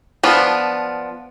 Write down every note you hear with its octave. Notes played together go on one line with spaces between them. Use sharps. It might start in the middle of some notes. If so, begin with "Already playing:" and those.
F3 B3 D4